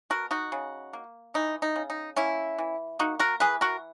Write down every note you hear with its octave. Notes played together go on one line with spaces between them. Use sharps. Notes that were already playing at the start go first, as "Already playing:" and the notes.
B2 F#4 A#4
D#4 F#4
C#3
A#3
E3 D#4
D#4
C#3
D#4
A#3 C#4 E4
E3
A#3 D#4 F#4
F#4 A#4
E3 G#4 B4
F#4 A#4